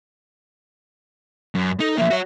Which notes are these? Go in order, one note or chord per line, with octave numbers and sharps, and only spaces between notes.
F#2
D#4 A4
F3 A#3 E5
F#4 C#5